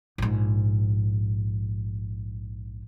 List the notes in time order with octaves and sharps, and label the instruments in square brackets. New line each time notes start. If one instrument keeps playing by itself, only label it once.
[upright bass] A#1 G#2